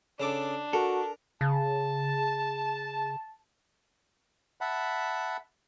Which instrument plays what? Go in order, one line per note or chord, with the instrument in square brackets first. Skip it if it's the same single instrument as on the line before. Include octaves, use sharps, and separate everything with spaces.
[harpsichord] C#3 A4 D6 [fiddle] D4
[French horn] F#4 [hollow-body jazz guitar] A4 [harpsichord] A#4
[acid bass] C#3 [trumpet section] A5
[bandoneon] E5 F#5 A5 B5